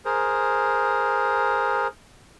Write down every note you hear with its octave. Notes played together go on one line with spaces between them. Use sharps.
G#4 A#4 C5